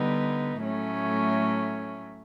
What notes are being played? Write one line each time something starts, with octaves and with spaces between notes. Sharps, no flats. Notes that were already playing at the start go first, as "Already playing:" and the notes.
Already playing: D3 G3 B3 D#4
A2 F#3 A3 C#4